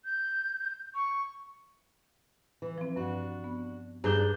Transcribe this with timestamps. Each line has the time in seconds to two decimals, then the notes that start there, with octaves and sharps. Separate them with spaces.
0.05 G6
0.95 C#6
2.62 E3
2.78 F3 C4
2.96 G2 D4 F#4 F#5
3.44 B3
4.04 G2 F3 D4 G#4 A#5 G6